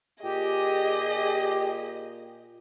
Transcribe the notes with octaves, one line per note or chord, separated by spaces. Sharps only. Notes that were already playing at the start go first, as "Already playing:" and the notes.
A#2 G4 G#4 D#5 G5